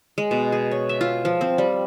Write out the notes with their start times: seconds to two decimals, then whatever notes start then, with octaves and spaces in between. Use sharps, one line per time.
0.18 G#3
0.31 B2
0.52 G#4
0.71 C#5
0.89 E5
1.01 F4
1.25 F3
1.41 C4
1.58 G3